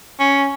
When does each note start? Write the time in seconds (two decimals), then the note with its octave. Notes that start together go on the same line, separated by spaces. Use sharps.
0.19 C#4